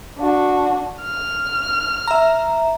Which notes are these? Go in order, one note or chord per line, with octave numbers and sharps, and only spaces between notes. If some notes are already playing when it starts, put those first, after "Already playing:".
D4 F#4
F6
E5 A#5